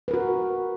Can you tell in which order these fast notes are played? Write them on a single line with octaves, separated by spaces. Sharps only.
B4 A#4 F#4